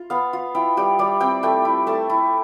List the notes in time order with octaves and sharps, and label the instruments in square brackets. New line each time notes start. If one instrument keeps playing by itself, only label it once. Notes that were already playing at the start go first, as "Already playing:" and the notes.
Already playing: [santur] F4
B3 F5
F4
E4 G5
G3 G5
G3 D5
C4 G5
A3 G5
E4
A3 A5
E4